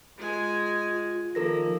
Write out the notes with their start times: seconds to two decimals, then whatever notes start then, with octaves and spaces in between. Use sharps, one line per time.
0.18 G#3 F4 G#5
1.35 D#3 F3 A#3 A4 A#4 A#6